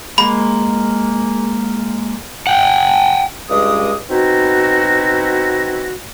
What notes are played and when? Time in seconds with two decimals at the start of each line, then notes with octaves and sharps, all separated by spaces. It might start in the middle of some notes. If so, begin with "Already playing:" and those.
0.18 G#3 A#3 B5
2.47 F#5 G5
3.49 C#2 G2 G#3 D6 D#6
4.09 B2 C4 D#4 E4 F#4